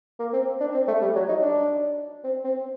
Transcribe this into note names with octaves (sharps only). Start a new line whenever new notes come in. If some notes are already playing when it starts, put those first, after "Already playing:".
A#3
C4
D4
C4
A3
G3
F#3
D#4
D4
C4
C4